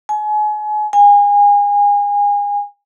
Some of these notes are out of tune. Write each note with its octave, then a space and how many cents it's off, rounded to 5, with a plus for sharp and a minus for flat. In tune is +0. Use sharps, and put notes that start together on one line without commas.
G#5 +35
G#5 -30